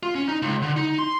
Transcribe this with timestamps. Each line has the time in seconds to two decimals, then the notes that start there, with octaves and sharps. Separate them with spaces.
0.03 F4
0.15 C#4
0.28 D#4
0.42 C#2
0.62 D3
0.76 D#4
0.99 C6